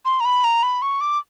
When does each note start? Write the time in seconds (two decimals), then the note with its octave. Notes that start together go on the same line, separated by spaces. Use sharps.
0.05 C6
0.20 A#5
0.25 B5
0.44 A#5
0.63 B5
0.82 C#6
1.01 D6